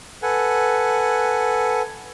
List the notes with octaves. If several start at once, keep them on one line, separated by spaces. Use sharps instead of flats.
A4 B4 F#5 G#5